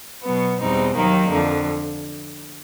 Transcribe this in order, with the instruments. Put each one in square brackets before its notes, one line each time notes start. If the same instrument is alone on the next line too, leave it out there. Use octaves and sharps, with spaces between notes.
[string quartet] B2 F#3 B3
E2 B2 G3 C4 D#4
D#2 D#3 F#3 A#3 D#4
F2 D3 F3